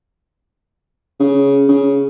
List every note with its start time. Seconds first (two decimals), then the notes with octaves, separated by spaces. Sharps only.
1.20 C#3
1.68 C#3